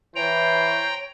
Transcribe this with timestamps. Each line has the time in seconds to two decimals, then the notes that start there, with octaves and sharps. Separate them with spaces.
0.15 E3 C5 C#5 G5 A#5